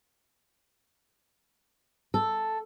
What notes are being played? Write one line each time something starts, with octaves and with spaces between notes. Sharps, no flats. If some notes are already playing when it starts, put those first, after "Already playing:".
A4